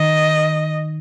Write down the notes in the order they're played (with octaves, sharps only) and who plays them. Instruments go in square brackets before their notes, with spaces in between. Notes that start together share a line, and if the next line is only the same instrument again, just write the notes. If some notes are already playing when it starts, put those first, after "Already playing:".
Already playing: [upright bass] D#3 [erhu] D#5